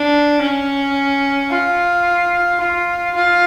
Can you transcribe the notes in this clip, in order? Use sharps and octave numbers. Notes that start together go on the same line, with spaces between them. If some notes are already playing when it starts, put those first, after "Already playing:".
Already playing: D4
C#4
F4
F4
F4